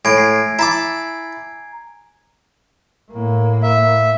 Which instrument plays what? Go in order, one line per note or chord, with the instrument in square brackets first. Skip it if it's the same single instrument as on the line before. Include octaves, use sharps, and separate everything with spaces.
[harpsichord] A2 [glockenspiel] G#5 G#6 D7
[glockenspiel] C7
[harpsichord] E4 A5 D6 [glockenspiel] A#5
[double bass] A2 A#3
[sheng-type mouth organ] E5